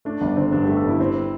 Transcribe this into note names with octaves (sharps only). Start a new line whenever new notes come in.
A3 D4
G1 D4
D3 C4
G2 D4
A3 G4
A4
G1 E4
C4